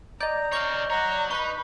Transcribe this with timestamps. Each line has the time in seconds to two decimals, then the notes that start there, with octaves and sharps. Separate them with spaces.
0.20 D5 D#5 A#5 G6
0.52 C#5 F5 C#6 G6 A#6
0.90 C#5 F#5 A#5
1.31 D#4 B4 B5 C#6